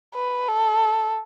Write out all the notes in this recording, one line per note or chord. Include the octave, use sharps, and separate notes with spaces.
B4
A4